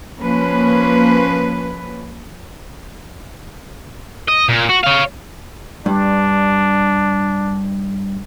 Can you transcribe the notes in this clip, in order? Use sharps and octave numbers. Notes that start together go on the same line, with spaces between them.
F3 A#3 C#4 B4
D#5
A#2
F#4
C#5 F5
G2 D4